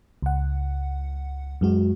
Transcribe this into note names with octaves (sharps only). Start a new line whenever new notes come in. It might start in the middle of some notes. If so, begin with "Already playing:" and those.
C#2 F#5
F#2 G#3 F#4